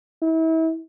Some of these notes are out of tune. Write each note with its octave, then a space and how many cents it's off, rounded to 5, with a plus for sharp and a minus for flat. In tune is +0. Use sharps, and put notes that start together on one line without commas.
E4 -35